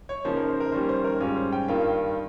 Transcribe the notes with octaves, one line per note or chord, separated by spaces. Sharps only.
C#5
C#3 F3 A#3 D#4 C5
A#4
C5
A#4
D#3 G3 A#3 C#4 C5
C5
A#4
G#2 G3 C#4 F4
C5
G5
G2 D#3 A#3 F4 G5